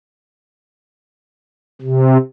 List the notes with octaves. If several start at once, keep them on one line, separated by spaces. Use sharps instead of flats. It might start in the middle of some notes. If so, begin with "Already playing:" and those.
C3